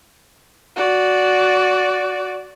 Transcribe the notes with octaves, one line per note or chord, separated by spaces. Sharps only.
F#4 D5